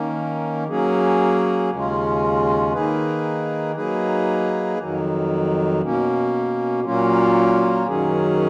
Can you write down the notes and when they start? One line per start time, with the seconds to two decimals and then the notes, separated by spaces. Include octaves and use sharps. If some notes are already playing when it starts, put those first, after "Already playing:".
Already playing: D#3 A#3 C#4
0.68 F#3 A#3 C#4 G#4
1.70 D#2 C#3 G#3 C#4 F4
2.73 D#3 A#3 D#4 G#4 B4
3.76 F#3 A#3 D#4 G#4 B4
4.79 F2 D#3 F#3
5.81 B2 A#3 C#4
6.84 A#2 F#3 A#3 C#4 F4
7.87 F#2 D#3 F#3 C#4 G#4